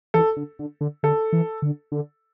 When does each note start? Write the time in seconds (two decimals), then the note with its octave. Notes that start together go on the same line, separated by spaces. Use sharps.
0.14 E3 A4
0.37 D3
0.59 D3
0.81 D3
1.03 D3 A4
1.33 E3
1.62 D3
1.92 D3